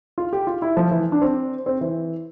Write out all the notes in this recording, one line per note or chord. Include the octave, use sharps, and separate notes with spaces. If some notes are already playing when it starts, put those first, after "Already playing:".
F4
G4
F4
E4
F3
E3
D4
C4
C4
E3